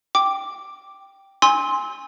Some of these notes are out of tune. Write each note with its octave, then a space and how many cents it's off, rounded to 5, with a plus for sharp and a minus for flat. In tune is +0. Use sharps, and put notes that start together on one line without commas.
G5 +0 D6 +0
G#5 -15 C6 +5 E6 -30